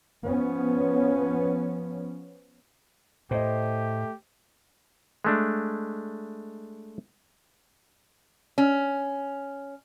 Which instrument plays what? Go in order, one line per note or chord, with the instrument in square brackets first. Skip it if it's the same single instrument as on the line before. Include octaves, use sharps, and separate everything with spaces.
[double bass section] F3 B3 C#4
[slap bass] A2 [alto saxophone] A3 [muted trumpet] G4 [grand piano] C5 D#5
[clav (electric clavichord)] G#3 A3 D4
[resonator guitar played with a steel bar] C#4